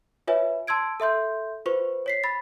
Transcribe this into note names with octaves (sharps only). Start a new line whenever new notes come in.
F4 B4 C#5 E5 G#5
A5 C6 E6 G#6 D7
A4 E5 C6 G6
F4 B4 C5 C#6
C#5 B6 C7
B5 A6